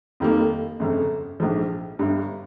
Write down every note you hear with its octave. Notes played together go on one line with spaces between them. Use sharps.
F1 F2 D#3 G3 A#3
G1 F2 C#3
A#1 G#2 F3
G1 G2 G3